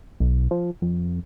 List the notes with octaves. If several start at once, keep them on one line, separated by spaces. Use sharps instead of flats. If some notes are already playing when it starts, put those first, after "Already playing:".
B1
F3
F2